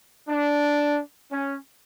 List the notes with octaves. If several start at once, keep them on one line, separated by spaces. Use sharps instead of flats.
D4
C#4